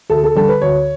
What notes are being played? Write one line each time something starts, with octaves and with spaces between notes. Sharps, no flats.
D2 A4
A4
D3 G3 A4
B4
D2 C#5